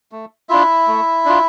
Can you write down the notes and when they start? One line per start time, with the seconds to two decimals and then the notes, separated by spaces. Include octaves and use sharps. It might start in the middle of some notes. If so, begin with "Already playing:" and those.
0.12 A3
0.49 D4 E4 F4 E5
0.88 A3
1.25 D4 F4